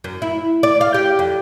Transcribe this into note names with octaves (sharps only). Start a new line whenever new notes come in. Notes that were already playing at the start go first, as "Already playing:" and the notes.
F#2
E4
D5
F5
G4
F2